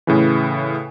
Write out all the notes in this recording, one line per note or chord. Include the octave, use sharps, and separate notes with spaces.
A2 C#3 E3